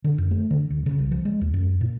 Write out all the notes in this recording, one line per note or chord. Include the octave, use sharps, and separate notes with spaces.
D3
F#2
A3
D3
D2
C#3
C2
F3
G#3
D#2
F#2
A#2